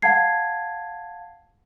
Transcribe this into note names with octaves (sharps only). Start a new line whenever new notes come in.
F5 F#5 A5 G#6 C7